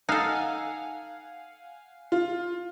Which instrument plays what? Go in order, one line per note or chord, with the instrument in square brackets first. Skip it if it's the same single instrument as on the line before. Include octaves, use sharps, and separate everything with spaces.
[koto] D#4 A4 [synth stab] F5 F#5 G#5
[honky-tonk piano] F4